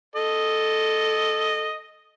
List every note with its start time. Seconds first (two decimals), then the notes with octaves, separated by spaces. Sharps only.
0.16 A4 D#5